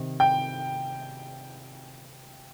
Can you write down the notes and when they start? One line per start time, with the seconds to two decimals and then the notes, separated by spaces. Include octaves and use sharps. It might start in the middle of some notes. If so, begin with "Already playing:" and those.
Already playing: C3 D#3
0.20 G5